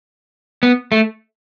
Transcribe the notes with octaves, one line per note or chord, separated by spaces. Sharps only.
B3
A3